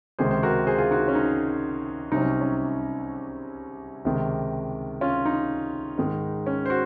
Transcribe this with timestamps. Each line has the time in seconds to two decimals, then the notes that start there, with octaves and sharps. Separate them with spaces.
0.19 C#2 C3 D#3 G#3 G#4 C5
0.31 C5
0.43 F#4 A#4
0.67 G#4 C5
0.78 F4 G#4
0.91 D#4 F#4
1.08 C#4
1.15 D#4
2.12 C2 C3 F#3 D#4
2.22 C#4
2.41 C#4
4.05 C#2 C3 D#3 G#3
5.01 C#4 F4
5.26 D#4
5.98 G#2 D#3 G#3
6.46 C#4
6.66 C5
6.70 F#4